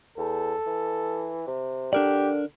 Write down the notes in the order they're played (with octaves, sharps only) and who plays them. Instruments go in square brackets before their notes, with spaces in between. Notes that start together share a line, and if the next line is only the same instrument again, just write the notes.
[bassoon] E2 [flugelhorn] A4
[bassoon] E3
C3
[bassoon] D3 [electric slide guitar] D4 A#4 D5 [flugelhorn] G4